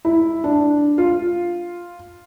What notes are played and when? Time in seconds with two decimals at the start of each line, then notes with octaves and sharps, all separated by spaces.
0.05 E4
0.44 D4
0.98 F4